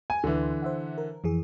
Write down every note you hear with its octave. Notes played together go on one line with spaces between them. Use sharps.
G#5
D2 D3 E3 C6
C5 E5 F#5
A#4
F2 E3 G#4